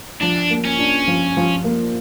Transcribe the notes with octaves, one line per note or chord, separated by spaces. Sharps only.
F3 D4
A#3
C#4
D4
F3
F3
A#3